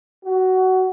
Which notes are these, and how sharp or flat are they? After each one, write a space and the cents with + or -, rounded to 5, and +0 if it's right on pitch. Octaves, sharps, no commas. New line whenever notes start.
F#4 +15